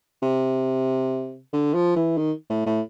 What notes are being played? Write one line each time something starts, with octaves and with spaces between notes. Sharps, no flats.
C3
D3
F3
E3
D#3
A2
A2